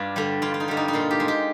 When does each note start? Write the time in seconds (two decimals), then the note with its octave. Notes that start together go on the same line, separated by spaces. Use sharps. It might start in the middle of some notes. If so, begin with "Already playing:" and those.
Already playing: G2 D4 F4
0.16 D3 G3
0.42 G2 F4
0.54 F4
0.60 D#4
0.68 D3 G3
0.77 D#4
0.88 D#4
0.93 A#2 F4
1.11 G4
1.20 G#3
1.28 G4